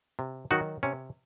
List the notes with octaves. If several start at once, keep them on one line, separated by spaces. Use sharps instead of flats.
C3
D#3 F#3 D#4 F#4
C3 C#4